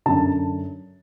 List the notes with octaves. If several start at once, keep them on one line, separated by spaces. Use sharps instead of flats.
F#2 D3 A5